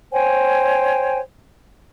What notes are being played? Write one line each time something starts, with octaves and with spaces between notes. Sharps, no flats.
C5 C#5 G5 G#5